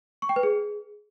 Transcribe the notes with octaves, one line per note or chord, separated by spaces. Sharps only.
C#6
G5
B4
G#4